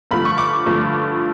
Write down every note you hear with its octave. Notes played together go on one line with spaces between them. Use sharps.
G2 D3 F3 A3 B5
C#6
D6
G2 D3 F3 A3